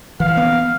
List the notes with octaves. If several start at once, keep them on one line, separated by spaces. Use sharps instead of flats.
E3 F5
B3